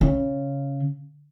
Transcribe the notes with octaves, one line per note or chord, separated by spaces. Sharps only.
C#3